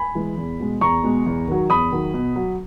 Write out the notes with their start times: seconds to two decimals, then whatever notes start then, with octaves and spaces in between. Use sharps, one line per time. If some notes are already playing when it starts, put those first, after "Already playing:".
Already playing: G#5 B5
0.15 E3 G#3
0.37 E2
0.60 B2 G#3
0.81 E2 A#5 C#6
1.04 B2 G#3
1.26 E2
1.48 D#3 F#3
1.70 E2 B5 D#6
1.92 D#3 F#3
2.14 B2
2.36 F#3